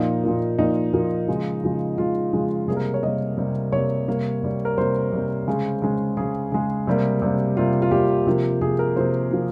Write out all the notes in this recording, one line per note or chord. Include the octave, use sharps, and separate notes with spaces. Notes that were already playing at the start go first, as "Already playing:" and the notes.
Already playing: A#2 F3 A#3 D#4
A#2 F3 A#3
A#2 F3 A#3 D#4
A#2 F3 A#3
C#3 F3 G#3
C#3 F3 G#3
C#3 F3 G#3 F4
C#3 F3 G#3
C3 G3 A#3 G#4
A#4
C#5
C3 G3 A#3 D#5
C3 G3 A#3
C3 G3 A#3 C#5
C3 G3 A#3
C3 G3 A#3
A#4
C3 G3 A#3 C5
C3 G3 A#3
C#3 G#3
C#3 G#3
C#3 G#3 G#4
C#3 G#3
C3 G3 A#3
C3 G3 A#3
C3 G3 A#3 F4
F4
C3 G3 A#3 G4
C3 F3 A#3
C3 F3 A#3 G#4
A#4
C3 F3 A#3 C5
C3 F3 A#3